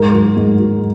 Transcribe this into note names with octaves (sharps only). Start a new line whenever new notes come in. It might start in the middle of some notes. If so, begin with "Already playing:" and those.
Already playing: G#2 A#4
F#3
G#2
F#3